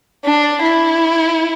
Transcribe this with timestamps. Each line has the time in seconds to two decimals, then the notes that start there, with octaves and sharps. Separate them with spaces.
0.25 D4
0.62 E4